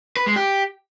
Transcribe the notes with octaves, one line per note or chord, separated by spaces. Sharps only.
B4
G#3
G4